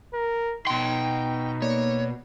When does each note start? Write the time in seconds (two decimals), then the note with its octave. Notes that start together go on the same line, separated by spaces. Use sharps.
0.14 A#4
0.67 B2 D#4 G5 C6
1.62 A#3 C#5 D5